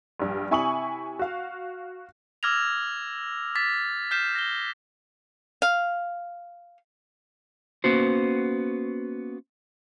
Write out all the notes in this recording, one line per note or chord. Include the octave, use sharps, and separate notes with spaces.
A#1 G2
C3 E4 G#5 C#6 D#6 F#7
F#4 F5
D6 E6 F6 G#6 A#6 F7
D6 A6 B6
F6 G6 B6 C7 E7
A#6 G7
F5
A#3 B3 C#4 F#4 C5